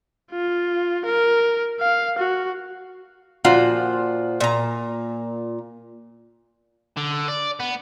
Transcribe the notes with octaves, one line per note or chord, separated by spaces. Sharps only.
F4
A#4
F5
F#4
A#2 F3 F4 F#4
A#2 A#5
D3
D5
B3